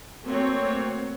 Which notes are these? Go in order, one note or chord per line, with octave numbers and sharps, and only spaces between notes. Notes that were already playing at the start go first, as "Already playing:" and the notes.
F#3 A3 A#3 C4 C#5